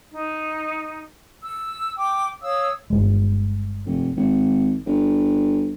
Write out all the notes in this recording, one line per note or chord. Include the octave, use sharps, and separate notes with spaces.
D#4
E6
G5 D6
C#5 F5 D#6 E6
G1 C2 G#3
F1
G#1
G1